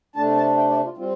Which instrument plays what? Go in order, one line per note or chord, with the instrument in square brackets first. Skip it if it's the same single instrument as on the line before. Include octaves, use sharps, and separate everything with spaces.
[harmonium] C3 A3 D4 A5
A5
G5
D5
F4
G3 C4 F4